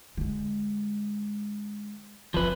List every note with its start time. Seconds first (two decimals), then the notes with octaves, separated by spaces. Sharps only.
0.17 D3 G#3
2.34 F#1 F3 C4 B4